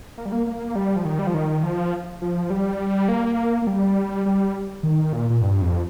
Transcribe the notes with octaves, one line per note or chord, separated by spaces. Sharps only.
A#3
G3
A#3
A#3
G3
F3
D#3
G3
F3
D#3
F3
F3
G3
A#3
A#3
G3
G3
D#3
A#2
A#2
G2
F2